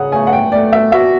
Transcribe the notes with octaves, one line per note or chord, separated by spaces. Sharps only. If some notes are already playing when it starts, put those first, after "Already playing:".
Already playing: C#3 F#5
A3 G#5
F#5
G5
A3 D5
E5
F#4 E5